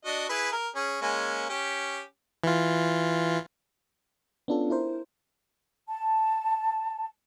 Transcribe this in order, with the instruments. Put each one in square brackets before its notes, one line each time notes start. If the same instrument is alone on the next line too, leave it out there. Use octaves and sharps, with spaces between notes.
[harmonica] D4 F#4 D#5
E4 G#4 B4
A#4
C#4 G#4
G#3 A#3 C#4
C#4 G4
[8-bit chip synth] E3 F4
[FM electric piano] B3 C#4 D4 F4 A4
E4 A#4 C5
[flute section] A5